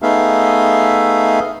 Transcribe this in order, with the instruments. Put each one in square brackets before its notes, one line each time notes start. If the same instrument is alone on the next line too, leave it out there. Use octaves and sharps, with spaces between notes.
[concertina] A3 B3 D#4 G#4 E5 F5